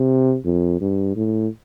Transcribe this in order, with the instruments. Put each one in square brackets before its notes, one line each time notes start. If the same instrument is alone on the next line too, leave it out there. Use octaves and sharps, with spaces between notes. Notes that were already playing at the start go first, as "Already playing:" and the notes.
Already playing: [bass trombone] C3
F2
G2
A2